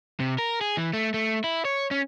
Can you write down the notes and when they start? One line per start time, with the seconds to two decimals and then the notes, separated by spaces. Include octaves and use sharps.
0.20 C3
0.38 A#4
0.61 G#4
0.77 E3
0.94 A3
1.14 A3
1.44 E4
1.65 C#5
1.91 C#4